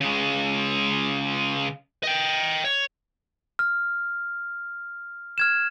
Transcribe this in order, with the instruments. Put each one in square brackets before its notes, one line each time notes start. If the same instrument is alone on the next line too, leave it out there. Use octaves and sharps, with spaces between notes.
[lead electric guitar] C#3 G#3
D#5 G5
C#5
[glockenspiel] F6
F6 G#6 E7